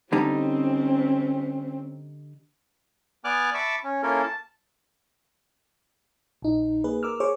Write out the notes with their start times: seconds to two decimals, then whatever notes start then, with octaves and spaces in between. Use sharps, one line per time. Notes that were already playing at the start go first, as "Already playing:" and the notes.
0.12 D3 G3 C4 C#4 D#4
3.24 B3 D5 G#5 D6 F6 F#6
3.54 E5 A5 B5 C#6 D6 E6
3.84 C#4
4.03 A#3 C#4 E4 F4 A4 A#4
4.23 A5
6.42 A#1 D#4
6.84 A#3 G#4 B4
7.03 A#4 D6 E6 F6
7.20 G#4 C5 C#5 C#6 D6